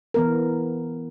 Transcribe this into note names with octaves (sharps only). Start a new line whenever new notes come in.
E3 B3 A#4